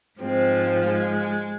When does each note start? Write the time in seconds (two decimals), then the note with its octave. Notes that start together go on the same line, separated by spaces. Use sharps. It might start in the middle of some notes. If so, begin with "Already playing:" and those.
0.20 G#2 F3 G#3 C4
0.85 G#3